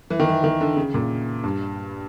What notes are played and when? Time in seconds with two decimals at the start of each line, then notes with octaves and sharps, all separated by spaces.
0.10 E3
0.20 D#3
0.29 E3
0.44 D#3
0.61 D3
0.76 C#3
0.94 A#2
1.44 G2